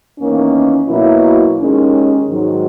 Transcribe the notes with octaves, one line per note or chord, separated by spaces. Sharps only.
E2 D#3 A#3 C#4
B2 F#3 A#3 E4
D#2 D#3 G#3 C#4
G#2 D#3 F#3